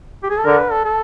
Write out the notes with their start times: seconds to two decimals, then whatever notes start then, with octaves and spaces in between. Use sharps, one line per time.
0.23 G4
0.30 G#4
0.38 A4
0.45 D3 A#4
0.58 B4
0.72 A4
0.85 A4